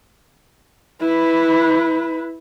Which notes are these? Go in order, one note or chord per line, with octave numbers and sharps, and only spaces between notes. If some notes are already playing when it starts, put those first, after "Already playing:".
E4 B4